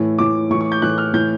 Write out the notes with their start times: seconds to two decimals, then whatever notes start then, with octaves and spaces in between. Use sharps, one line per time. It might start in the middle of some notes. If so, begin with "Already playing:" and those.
Already playing: A2 E3
0.18 A2 E3 D6
0.50 A2 C#6
0.54 E3
0.61 C#6
0.72 G6
0.82 A2 E3 F#6
0.98 F6
1.13 A2 E3 G6